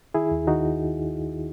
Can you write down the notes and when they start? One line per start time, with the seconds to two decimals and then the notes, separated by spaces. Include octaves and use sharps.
0.14 D#3 E4 G#4
0.31 D#2
0.47 D#3 D#4 F#4